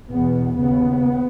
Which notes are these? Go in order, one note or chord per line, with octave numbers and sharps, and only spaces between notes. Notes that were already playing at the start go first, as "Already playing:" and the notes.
E2 B2 B3
D#2 C#3 B3